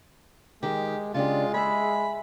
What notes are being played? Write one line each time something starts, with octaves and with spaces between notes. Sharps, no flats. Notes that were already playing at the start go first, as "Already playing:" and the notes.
D#3 G#3 G4
C#3 G#3 D4 F4 G4
G#4 E5 B5